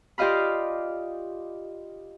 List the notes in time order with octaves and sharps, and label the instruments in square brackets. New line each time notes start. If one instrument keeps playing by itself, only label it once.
[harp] F4 G4 D5 D#5 F5 B5